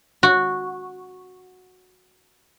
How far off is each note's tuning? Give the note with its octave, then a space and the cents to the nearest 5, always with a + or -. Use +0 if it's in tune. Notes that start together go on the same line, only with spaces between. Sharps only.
F#4 -10